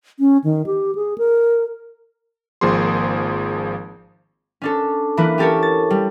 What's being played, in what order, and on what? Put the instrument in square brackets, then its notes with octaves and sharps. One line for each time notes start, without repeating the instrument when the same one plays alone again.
[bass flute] C#4
D#3
G4
G#4
A#4
[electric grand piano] G#1 F3 A#3 G#4 C6
[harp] C#4 D4 A4
E3 A#3 E4 B4
C#4 G4 A4 A#4 C#5
A6
G3